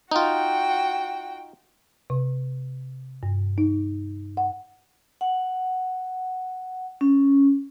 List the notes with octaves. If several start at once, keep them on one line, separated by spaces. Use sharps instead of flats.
D#4 F4 F#4 G5
C3
G2
D#4
F#5
F#5
C#4